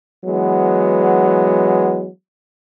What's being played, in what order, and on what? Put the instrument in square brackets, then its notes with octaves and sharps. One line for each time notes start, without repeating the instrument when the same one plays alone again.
[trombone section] E3 F#3 G#3 B3